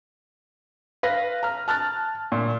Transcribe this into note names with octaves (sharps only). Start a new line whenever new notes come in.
B4 F5 A#6 B6
A#5 F6
A5 F6 F#6 A6
A#2